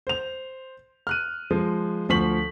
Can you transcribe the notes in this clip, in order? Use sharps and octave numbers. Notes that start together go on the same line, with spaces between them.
C5 F7
F6 F#6 D#7
F3 G#3
D2 F3 C#6 B6 F#7